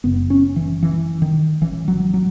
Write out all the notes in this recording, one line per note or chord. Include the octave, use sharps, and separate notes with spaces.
F#1 F#2 C#3 B3
C#4
E3
E3
D#3
A1 A2 E3
F#3
F#3